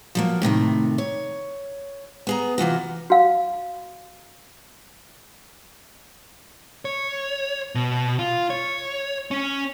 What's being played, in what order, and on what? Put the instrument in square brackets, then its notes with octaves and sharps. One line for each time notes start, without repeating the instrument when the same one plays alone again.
[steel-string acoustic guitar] F3 F#3 A#3
A2 C3 D#3 A3
C#5
B3 G#4 A#5
C3 E3 F4 F#4
[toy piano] F#4 F5
[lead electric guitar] C#5
B2
F4
C#5
C#4